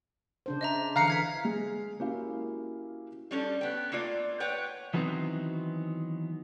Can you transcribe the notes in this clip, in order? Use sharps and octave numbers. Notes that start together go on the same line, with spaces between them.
C#3 D4 C5
D#5 E5 A#5
D3 E3 F5 A#5 F6 F#6 C7 C#7
F6 G#6 B6
G#3
A#3 C#4 E4 F#4 G4 F5
G3 C#4 A4
B3 G5
A3 A#3 F4 D5
B4 C#5 F#5 G5
D#3 E3 F#3 B3 C4 D#4